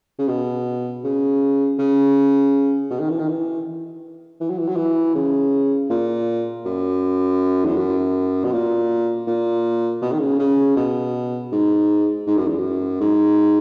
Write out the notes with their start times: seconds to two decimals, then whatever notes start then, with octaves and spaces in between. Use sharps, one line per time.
0.19 C#3
0.28 B2
1.04 C#3
1.79 C#3
2.90 B2
3.00 D#3
3.10 E3
3.19 D#3
3.29 E3
4.41 E3
4.50 F#3
4.59 E3
4.68 F#3
4.76 E3
5.15 C#3
5.90 A#2
6.65 F#2
7.65 E2
7.77 F#2
8.45 B2
8.52 A#2
9.27 A#2
10.02 B2
10.13 D#3
10.20 C#3
10.39 C#3
10.77 B2
11.52 G#2
12.27 G#2
12.37 F#2
12.47 E2
12.58 F#2
13.00 G#2